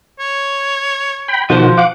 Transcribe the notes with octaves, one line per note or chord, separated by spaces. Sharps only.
C#5
G5 B5
B2 D#3 F3 F#4 C5
F5 F#5 D6